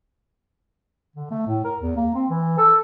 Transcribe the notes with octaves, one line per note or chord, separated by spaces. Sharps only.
D3
A3
A2
A#4
E2
A#3
C4
E3
A4